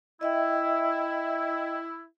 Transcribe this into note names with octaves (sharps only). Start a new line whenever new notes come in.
E4 D#5 E5 G5